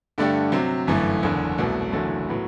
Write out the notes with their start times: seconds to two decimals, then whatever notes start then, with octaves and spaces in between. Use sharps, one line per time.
0.18 G2 D3 A3 D4 G4
0.52 C3 F#3 C4
0.87 G1 F#2 E3 A3
1.22 F#1 E2 D3
1.58 C2 B2 F#3 A3
1.93 F#1 E2 D3 F#3 A3
2.28 A2 F#3 B3